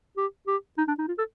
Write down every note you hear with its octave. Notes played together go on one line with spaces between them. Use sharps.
G4
G4
D#4
D4
D#4
F4
A4